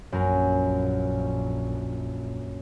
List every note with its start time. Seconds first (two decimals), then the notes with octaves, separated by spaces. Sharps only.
0.12 A#1 F#2 A#4